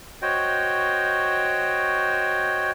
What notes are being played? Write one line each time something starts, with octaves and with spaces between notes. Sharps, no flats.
F#4 C5 C#5 D#5 G5